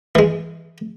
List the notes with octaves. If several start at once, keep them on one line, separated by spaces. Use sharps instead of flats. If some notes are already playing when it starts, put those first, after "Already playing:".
E3 G#3